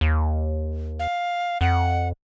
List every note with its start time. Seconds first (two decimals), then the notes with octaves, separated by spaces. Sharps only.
0.01 D#2
0.99 F5
1.61 F2 F#5